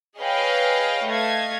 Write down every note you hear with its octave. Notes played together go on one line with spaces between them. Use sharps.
G#4 B4 C#5 D#5 F5 G5
A3 D#5 F5 G#6